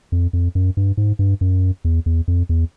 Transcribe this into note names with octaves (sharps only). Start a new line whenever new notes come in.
F2
F2
F#2
G2
G#2
G2
F#2
E2
E2
F2
E2